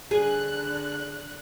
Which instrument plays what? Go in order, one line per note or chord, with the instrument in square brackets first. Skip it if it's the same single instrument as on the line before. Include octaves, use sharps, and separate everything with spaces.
[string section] D3 F#6 [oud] G#4